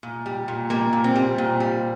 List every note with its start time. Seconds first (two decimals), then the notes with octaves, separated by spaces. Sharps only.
0.03 A#2
0.26 G3
0.48 A#2
0.70 G3 A#3
0.93 A#2
1.04 C4
1.15 G3
1.38 A#2
1.60 G3